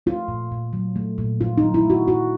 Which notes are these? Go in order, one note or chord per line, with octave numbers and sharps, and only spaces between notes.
A3 F4
A#2
A#2
F#3
A3
A#2
A#2 F4
D#4
F#3
E4
A3
F#4
A#2 F#4